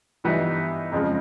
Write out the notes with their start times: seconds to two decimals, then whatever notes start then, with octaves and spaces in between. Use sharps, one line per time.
0.24 G2 E3 G3 B3 D#4
0.92 F2 C#3 F3 G#3